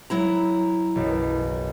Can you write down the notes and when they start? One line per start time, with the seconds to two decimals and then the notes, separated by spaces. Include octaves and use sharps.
0.10 F#3 E4 A#5
0.96 F#1 B1